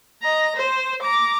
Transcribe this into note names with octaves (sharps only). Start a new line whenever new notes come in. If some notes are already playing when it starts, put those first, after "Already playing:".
D#5 A#5
C5
A#5 D6